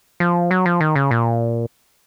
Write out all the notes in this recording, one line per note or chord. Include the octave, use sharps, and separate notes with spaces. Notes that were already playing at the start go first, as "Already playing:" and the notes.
F3
F#3
F3
D#3
C#3
A#2